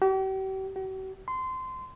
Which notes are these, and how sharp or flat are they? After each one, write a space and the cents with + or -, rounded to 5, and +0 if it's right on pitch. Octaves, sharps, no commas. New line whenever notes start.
G4 -45
F#4 +45
C6 -20